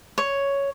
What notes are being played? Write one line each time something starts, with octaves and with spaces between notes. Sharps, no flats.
C#5